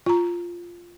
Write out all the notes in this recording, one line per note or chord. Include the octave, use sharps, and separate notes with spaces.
F4 A#5